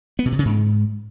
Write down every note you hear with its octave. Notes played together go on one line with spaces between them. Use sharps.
B3
B2
C3
C#3
G#2